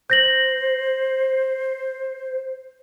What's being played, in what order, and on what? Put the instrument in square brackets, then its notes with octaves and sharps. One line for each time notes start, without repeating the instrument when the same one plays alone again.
[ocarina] C5 [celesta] G6 A#6 F#7